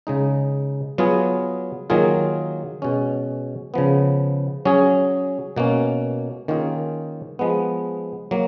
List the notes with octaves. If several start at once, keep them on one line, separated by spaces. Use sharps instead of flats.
C#3 G#3 D#4
F#3 B3 F4 G#4
D#3 F#3 A#3 F4 G#4
B2 G#3 C#4
C#3 F3 B3
F#3 C#4 G#4
B2 A#3 C#4
D#3 A#3 C#4 F4 G#4
F3 G#3 B3
F#3 A#3